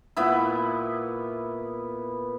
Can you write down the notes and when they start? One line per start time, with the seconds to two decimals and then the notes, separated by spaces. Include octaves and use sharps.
0.17 A#2 B3 E4